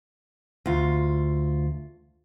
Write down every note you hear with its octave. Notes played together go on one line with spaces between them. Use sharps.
D2 F4